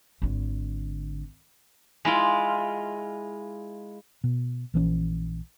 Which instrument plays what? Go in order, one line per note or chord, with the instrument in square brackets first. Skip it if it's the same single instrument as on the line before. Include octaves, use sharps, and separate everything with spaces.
[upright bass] G#1 D3
[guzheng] G#3 E4 F4
[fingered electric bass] B2
A#1 E3 C#4